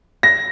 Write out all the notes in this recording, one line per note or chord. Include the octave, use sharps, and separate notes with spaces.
A#6